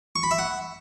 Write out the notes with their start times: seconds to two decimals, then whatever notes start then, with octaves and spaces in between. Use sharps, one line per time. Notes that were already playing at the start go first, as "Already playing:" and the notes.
0.16 C#6
0.23 B5
0.31 E5
0.39 F#5